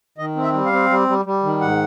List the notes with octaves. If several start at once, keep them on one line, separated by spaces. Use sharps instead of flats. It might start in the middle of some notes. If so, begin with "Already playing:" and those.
D#3 D#5
C4
E5
G3
F5
C4
G3
G3
G3
D#3
G#2 F#5